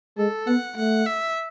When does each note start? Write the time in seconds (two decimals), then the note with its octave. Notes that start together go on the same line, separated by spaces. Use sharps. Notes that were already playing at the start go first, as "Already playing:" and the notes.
0.18 G#3 A4
0.47 B3 F#5
0.77 A3 F#5
1.06 E5